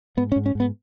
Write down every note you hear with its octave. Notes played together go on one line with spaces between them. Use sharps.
G#2 B3
C#4
G#2
C#4
G#2 B3